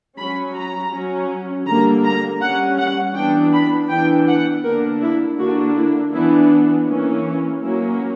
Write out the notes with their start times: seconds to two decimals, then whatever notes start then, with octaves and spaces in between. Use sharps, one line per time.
0.18 F#3 C#4 B5
0.55 A#5
0.92 F#3 C#4
1.66 D3 G3 A#3 A#5
2.04 A#5
2.40 G3 C#4 F#5
2.78 F#5
3.15 E3 B3 D4 G5
3.52 B5
3.90 E3 B3 D4 G5
4.27 F#5
4.64 D3 A#3 D4 A#4
5.02 E4
5.38 D3 A#3 D4 F#4
5.76 E4
6.13 E3 B3 D4 E4
6.87 E3 A#3 C#4
7.62 F#3 A#3 C#4 E4